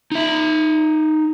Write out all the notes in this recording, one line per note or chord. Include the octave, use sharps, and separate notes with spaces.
D#4 E5